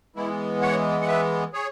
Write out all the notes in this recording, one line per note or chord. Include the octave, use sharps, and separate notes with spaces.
E3 G#3 B3 E4
C#5 F#5
F#5
B4 E5
G#4 C#5